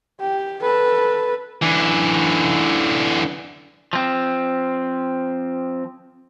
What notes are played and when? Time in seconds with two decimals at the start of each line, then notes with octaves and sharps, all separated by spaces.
0.20 G4
0.62 A4 B4
1.62 D3 E3
3.93 F3 C4